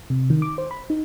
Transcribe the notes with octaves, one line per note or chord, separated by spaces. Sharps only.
C3
D#3
D6
C5
B5
D#4